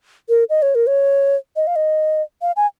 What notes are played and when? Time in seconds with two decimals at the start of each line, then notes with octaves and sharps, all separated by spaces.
0.29 A#4
0.50 D#5
0.62 C#5
0.75 A#4
0.87 C#5
1.56 D#5
1.67 F5
1.76 D#5
2.42 F5
2.56 G#5